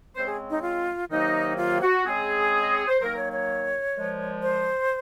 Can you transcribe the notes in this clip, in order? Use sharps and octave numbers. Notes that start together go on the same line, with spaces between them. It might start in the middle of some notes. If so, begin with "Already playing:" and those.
C#3 G#3 C4 C5
G#4
D#4
F4
C3 D#3 F#3 A#3 D#4
F4
F#4
C#3 G#3 C4 G#4
D#5
C#5
C5
D#3 F#3 A#3 A#4
C#5
C#5
A#2 F3 G#3
C5